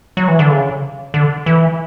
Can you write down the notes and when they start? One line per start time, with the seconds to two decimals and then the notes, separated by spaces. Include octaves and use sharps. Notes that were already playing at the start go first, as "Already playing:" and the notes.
0.17 F#3
0.28 E3
0.39 D3
0.50 C#3
1.14 D3
1.46 E3